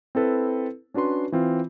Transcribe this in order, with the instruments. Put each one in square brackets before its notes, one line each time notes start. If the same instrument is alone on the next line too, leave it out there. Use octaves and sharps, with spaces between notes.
[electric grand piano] C4 E4 A4 B4
C#4 D4 F#4 B4 C6
E3 C4 F4